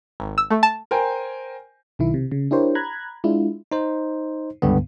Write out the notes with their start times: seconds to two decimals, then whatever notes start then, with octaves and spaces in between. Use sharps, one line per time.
0.20 G#1
0.38 E6
0.51 A3
0.63 A5
0.91 A#4 C5 G5 G#5
1.99 B1 D#3 E4
2.14 C3
2.32 C#3
2.51 D4 E4 G4 A#4 C5 C#5
2.75 A#5 B5 F#6 G#6
3.24 G#3 D4 E4 F4
3.72 D#4 C5
4.62 C#2 G2 D3 B3